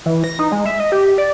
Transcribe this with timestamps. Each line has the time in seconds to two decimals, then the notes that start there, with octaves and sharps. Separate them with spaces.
0.06 E3
0.24 A#6
0.39 D#4
0.52 G#3
0.66 E5
0.80 D#5
0.92 G4
1.18 D5